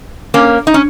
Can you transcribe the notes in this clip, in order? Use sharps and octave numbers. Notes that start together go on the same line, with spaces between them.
A#3 C#4
D#4
C#4